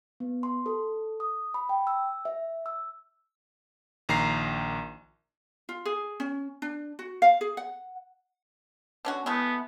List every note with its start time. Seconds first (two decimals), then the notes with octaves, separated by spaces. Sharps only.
0.20 B3
0.43 C6
0.66 A4
1.20 D#6
1.54 B5
1.69 G5
1.87 E6
2.25 E5
2.66 E6
4.09 A#1 D#3 A#5 C7
5.69 F4
5.86 G#4
6.20 C#4
6.62 D4
6.99 F#4
7.22 F5
7.41 G#4
7.57 F#5
9.05 D3 C#4 F#4
9.26 G#3 A3 B3 E4